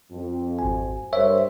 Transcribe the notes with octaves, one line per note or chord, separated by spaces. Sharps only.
F2
G#1 G#5
G2 A#4 C5 C#5 E5